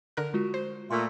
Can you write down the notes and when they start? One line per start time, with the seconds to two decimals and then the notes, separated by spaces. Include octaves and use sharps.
0.17 D3 A#4 F#6
0.34 G#3 F4 F#4
0.54 C5
0.91 A#2 A3 C6